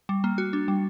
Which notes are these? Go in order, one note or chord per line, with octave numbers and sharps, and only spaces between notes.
G3
A#3
F#4
D4
G3